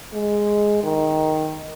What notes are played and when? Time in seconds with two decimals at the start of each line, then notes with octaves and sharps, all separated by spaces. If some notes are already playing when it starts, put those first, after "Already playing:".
0.13 G#3
0.83 D#3